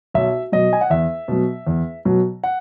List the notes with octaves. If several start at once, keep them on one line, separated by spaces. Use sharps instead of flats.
B1 E5
B2 F#3 D#5
G#5
F#5
E2 E5
B2 F#3
E2
B2 F#3
F#5